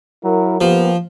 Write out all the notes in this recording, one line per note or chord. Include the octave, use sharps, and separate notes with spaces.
F#3 E4 A#4
F3 A#3 B3 G4